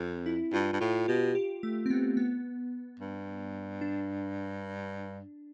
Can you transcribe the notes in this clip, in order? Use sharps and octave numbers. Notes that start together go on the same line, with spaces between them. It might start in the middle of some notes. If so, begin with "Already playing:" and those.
Already playing: F2 C4
E4
G2 F4
G2
A2 F4
B2 G4
G4
A3
C4
B3
B3
G2
D4